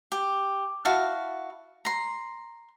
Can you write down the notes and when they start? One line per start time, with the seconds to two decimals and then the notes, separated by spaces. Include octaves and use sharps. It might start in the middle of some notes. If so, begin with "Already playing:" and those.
0.12 G4
0.85 E4 F#4 F5 A5
1.85 A#5 C6